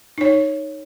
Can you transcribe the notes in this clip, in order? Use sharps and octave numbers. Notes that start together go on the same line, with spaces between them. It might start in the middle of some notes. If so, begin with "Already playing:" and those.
D#4 C#5